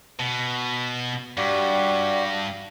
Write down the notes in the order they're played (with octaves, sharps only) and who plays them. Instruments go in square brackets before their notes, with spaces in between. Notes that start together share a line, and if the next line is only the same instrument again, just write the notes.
[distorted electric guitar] B2
[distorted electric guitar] G2 [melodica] G3 F#4 G4